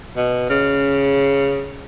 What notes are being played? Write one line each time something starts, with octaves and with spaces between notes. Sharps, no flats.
B2
C#3